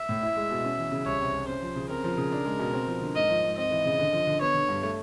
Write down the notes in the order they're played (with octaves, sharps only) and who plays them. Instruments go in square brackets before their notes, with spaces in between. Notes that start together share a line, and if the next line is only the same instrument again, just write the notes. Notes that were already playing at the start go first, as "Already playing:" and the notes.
Already playing: [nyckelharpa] E5
[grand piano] A2
E4
G#3
B2
C#4
E3
C#3
[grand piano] C2 [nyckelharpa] C#5
[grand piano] C3
C2
[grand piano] C#4 [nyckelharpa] C5
[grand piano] F3
C#3
[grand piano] C4 [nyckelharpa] A#4
[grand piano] F3
C#3
D4
G#3
B2
C4
F3
D3
[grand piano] G#2 [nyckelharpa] D#5
[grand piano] F3
G#2
[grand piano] C4 [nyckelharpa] D#5
[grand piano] E3
C#3
D3
F3
D3
[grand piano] B3 [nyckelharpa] C#5
[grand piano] D3
G2
A3